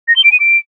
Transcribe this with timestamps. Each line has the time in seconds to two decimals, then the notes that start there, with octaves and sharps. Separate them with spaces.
0.08 A#6
0.16 G7
0.24 D7
0.32 D#7
0.40 D7